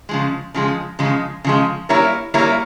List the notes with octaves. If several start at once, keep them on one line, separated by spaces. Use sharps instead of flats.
C#3 F3 G#3
C#3 F3 G#3
C#3 F3 G#3
C#3 F3 G#3
G3 A#3 E4 A#4 C#5
G3 A#3 E4 A#4 C#5